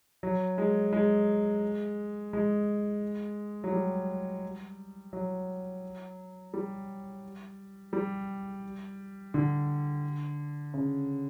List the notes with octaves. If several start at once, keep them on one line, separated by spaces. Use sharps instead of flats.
F#3
G#3
G#3
G#3
F#3
G3
F#3
G3
G3
D3
C#3